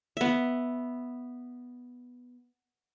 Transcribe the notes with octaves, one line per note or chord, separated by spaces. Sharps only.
B3 E5